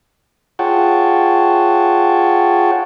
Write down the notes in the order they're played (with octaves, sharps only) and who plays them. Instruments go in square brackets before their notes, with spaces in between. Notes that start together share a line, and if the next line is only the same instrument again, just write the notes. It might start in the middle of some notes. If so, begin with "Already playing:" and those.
[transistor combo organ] F4 G#4 C#5 F#5 G5 A5